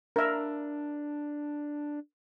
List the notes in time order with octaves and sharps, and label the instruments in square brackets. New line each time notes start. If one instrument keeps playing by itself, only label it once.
[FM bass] D4 [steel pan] A#4 E5